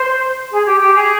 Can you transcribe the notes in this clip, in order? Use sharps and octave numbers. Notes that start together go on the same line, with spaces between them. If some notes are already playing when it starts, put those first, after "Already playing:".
Already playing: C5
G#4
G4
G4
G#4